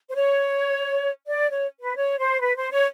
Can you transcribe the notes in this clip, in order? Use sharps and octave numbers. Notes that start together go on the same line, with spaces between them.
C5
C#5
D5
C#5
B4
C#5
C5
B4
C5
C#5